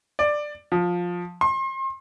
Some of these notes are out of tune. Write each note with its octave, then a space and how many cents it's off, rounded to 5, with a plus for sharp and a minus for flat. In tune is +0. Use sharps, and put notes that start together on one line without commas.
D5 +10
F3 +15
C6 +35